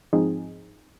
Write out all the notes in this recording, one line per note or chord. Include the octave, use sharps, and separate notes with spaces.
G#2 F3 C4 D#4 G#4